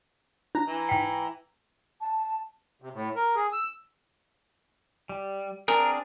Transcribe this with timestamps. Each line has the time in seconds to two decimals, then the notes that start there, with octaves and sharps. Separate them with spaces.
0.55 D4 A#5
0.68 E3
0.89 G#2 G5 B6
2.01 A5
2.82 C3
2.94 A2
3.16 A#4
3.35 G#4
3.53 E6
5.09 G3
5.68 C4 D4 G#4 A#4